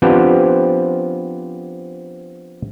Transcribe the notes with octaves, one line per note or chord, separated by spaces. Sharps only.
F3 B3 C4 D4 G4 B4